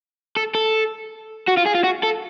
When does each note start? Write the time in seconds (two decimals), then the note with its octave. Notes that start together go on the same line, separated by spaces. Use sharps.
0.36 A4
0.55 A4
1.48 F#4
1.57 F4
1.66 G#4
1.74 F4
1.84 F#4
2.03 A4